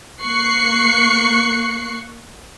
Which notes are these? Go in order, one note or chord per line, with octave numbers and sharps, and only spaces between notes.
A#3 C#6 F#6 C7 C#7